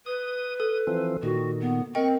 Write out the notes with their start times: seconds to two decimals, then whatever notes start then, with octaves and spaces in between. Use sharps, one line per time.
0.06 B4 D#6
0.60 A4 D#6
0.87 E3 F3 C4
1.23 A#2 D#3 F#4
1.60 B3
1.95 C4 A#4 D#5 G5 C#6